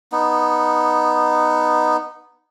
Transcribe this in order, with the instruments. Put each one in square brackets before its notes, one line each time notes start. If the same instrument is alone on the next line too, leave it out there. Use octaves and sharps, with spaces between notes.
[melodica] B3 D#4